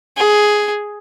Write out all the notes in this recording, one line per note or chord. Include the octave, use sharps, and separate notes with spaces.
G#4